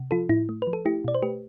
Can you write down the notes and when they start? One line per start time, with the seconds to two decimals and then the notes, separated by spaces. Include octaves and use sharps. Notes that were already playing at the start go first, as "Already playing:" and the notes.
Already playing: C3
0.11 F3 F4 A4
0.29 A2 E4
0.49 A3
0.62 B4
0.67 F3
0.73 A4
0.85 A3 E4 G4
1.04 B2 D5
1.15 C5
1.22 A3 G4 B4